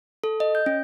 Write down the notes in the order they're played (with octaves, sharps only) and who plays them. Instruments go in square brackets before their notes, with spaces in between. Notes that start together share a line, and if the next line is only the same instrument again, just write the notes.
[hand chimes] A4
D#5
G6
C#4